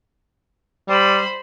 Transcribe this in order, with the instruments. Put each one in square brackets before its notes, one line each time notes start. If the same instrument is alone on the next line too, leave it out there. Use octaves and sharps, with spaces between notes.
[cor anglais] G3 [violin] C5 B5